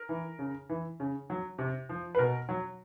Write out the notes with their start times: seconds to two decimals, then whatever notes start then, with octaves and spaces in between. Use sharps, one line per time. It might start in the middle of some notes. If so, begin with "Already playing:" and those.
Already playing: A#4
0.09 E3
0.39 C#3
0.69 E3
1.00 C#3
1.30 F#3
1.58 C3
1.89 F3
2.15 B4
2.19 B2 A#4
2.49 F#3